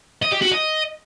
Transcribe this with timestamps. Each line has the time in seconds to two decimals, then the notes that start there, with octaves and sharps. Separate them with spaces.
0.22 D#5
0.32 G4
0.42 F#4
0.51 D#5